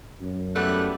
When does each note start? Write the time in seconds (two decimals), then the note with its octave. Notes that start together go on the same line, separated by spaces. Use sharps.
0.21 F#2
0.56 E3 G3 A3 B3 F#6